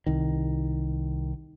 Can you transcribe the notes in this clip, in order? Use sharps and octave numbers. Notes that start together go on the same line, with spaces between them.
C2 D#3